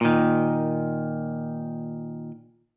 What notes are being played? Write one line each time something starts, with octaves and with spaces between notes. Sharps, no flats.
A#2 D#3